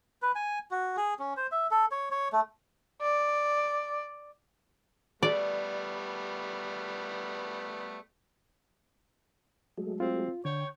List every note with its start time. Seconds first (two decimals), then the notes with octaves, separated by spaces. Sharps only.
0.22 B4
0.35 G#5
0.71 F#4
0.97 G#4
1.19 C#4
1.37 C5
1.52 E5
1.71 A4
1.91 C#5
2.11 C#5
2.33 A3
3.02 D5
5.23 G3 A3 B3 D5
9.78 F#3 G#3 A3
10.00 C4 F4
10.45 D3 C#5 G5